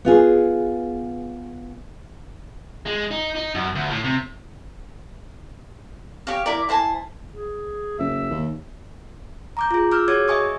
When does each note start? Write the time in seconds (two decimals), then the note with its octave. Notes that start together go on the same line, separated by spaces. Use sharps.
0.05 B3 F4 G#4
2.86 G#3
3.11 D#4
3.35 D#4
3.55 F#2
3.75 D2
3.90 A2
4.04 C3
6.27 G4 C#5 F5
6.46 E4 A#4 D5
6.69 E4 C5 G#5 A5
7.30 G#4
7.99 F#1 E5
8.31 D#2
9.57 A#5 D6 G6
9.71 F4 G#4
9.92 D6 E6 F6 G6
10.08 F#4 G#4 C#5 D6 G#6
10.28 D#5 E5 G#5 C#6 D#6